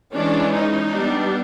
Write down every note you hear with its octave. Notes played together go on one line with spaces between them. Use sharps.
E3 G#3 C#4 D4
D#4
G3 B3 D4